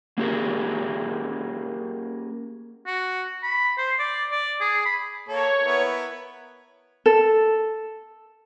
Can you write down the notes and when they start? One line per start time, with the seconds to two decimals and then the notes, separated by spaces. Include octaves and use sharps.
0.18 A#3 C#4 G4 G#4 A#4
2.86 F#4
3.43 B5
3.78 C5
3.99 D5
4.32 D5
4.60 G#4
4.85 B5
5.29 A#3 A4 C#5
5.64 B3 E4 A#4
7.06 A4